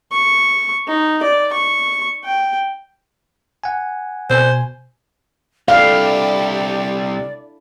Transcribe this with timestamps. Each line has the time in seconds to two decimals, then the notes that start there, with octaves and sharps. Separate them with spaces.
0.12 C#6
0.88 D#4
1.23 D5
1.53 C#6
2.24 G5
3.64 F#5 G#5
4.30 B2 C5 G#5
5.68 C2 A3 D4 E4 G4 D5 F5